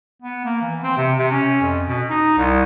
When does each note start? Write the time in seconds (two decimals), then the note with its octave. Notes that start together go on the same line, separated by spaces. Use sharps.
0.22 B3
0.45 A#3
0.62 E3
0.83 C4
0.97 C3
1.19 C3
1.31 C#4
1.61 F2
1.86 B2
2.10 D#4
2.38 C2